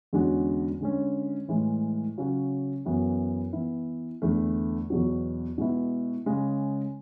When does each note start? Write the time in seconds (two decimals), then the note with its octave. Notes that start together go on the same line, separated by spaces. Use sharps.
0.13 E2 D3 G#3 C#4 F#4
0.81 D3 G#3 C#4
1.48 A2 E3 G#3
2.18 C#3 F#3 C#4 F#4
2.85 F#2 E3 B3 F#4
3.53 E3 B3 E4
4.22 E2 D3 A3
4.90 E2 B2 F#3
5.58 B2 G#3 B3 E4
6.26 C#3 G#3 C#4